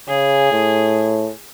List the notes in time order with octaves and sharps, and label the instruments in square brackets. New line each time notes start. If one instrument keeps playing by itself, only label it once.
[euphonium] C#3 [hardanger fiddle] G#4
[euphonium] A2